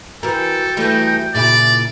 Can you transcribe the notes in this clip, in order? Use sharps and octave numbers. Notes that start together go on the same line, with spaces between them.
E3 F#4 A4 A#4 G5
E3 G3 A3 D#4
A#2 C#3 E4 D5